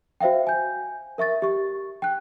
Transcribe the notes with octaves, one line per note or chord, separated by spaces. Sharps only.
F#4 C5 E5 F5 G5
G#5 G6
A#4 E5 C#6 A6
G4 C#6
G5 F#6